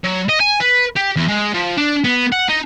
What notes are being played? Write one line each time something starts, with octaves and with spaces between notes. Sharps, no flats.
F#3
D#5
G#5
B4
G4
E2
G#3
F3
D4
B3
F#5
D#4